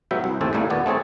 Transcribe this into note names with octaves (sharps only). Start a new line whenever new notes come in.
G#2 F#3 B3 E5 G5
C2
G1 D#2 A2 C4 A4 G#5
A2 C#3 G3 A3 A#3 E4
D#2 A#2 B3 D5
A3 C4 G#4 C#5 A5